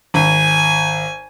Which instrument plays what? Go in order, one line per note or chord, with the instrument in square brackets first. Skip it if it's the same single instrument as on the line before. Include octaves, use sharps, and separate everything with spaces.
[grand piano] G#1 [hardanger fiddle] G#5